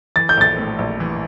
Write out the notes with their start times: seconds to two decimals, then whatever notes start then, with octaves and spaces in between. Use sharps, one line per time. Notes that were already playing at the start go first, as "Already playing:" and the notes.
0.16 E3 A6
0.29 G6
0.37 A#1 A6
0.58 A2
0.79 A#1
1.00 E3